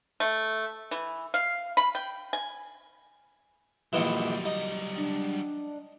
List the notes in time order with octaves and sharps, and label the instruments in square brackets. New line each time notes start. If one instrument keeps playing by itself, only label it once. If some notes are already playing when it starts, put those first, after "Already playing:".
[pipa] A3
E3
F5
B5
G5
G#5
[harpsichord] A#1 D#3 E3 [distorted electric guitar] F#3 G3
[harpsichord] D#4
[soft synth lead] D4